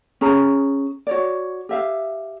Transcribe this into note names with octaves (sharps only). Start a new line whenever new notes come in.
C#4 G#4 A#5
F#4 C#5 D5
G4 E5 F5